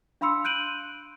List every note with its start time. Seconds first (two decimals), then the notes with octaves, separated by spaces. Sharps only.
0.21 D4 F5 B5 C6 E6 C#7
0.44 F#6 G6 D7 D#7 F#7